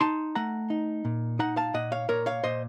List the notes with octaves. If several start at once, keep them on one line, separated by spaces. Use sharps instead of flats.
D#4 A5 C6
A3 F#5 A#5
D#4
A#2
D#4 F#5 A#5
F5 A5
A#2 D#5 F#5
C#5 F5
A#2 A#4 C#5
C#5 F5
A#2 C5 D#5